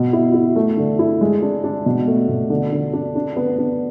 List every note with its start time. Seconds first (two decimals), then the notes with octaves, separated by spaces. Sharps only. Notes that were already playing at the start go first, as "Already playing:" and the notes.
Already playing: B2
0.13 E4
0.34 E4
0.56 A3
0.78 D3
0.99 E4
1.21 G#3
1.42 D4
1.64 D4
1.86 B2
2.07 A3
2.29 B2
2.50 D3
2.72 D3
2.93 D4
3.16 D4
3.36 B3
3.58 D4